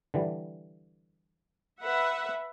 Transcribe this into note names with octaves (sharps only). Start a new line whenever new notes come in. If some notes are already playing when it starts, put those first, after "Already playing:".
D3 E3 G3
B4 E5 F#5